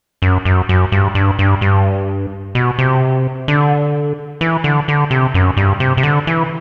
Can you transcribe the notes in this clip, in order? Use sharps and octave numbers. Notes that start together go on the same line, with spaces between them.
F#2
F#2
F#2
G2
G2
G2
G2
B2
C3
D3
E3
D3
D3
C3
F#2
G2
C3
C3
D3
E3